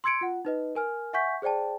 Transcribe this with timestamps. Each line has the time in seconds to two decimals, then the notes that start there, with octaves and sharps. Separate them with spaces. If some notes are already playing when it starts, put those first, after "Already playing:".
0.04 C6 E6 G#6 C#7 D7
0.21 F4 F#5
0.45 D#4 B4 D#5
0.75 A#4 G#5 F6
1.13 E5 F#5 G#5 C#6 G6 B6
1.42 G#4 C5 D5 G5 A5